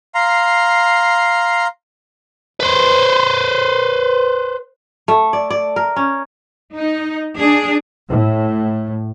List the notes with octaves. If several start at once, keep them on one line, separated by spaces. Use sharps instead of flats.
F5 A#5 C6
B4 C5
A3
D5
D5
A#4
C#4
D#4
D4 G#4
A2